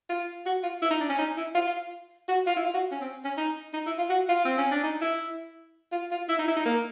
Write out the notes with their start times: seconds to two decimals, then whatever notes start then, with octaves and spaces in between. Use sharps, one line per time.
0.09 F4
0.46 F#4
0.63 F4
0.82 E4
0.91 D#4
1.00 D4
1.09 C#4
1.19 D#4
1.37 E4
1.55 F4
1.67 F4
2.28 F#4
2.47 F4
2.56 E4
2.65 F4
2.74 F#4
2.92 C#4
3.01 C4
3.25 C#4
3.37 D#4
3.73 D#4
3.86 E4
3.98 F4
4.10 F#4
4.29 F4
4.45 C4
4.58 C#4
4.71 D4
4.83 D#4
5.01 E4
5.92 F4
6.11 F4
6.29 E4
6.39 D#4
6.48 E4
6.56 D#4
6.66 A#3